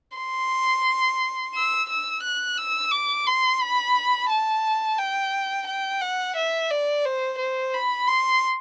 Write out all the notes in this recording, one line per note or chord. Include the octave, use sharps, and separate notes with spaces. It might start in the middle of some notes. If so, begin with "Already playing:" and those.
C6
E6
E6
F#6
E6
D6
C6
B5
A5
G5
G5
F#5
E5
D5
C5
C5
B5
C6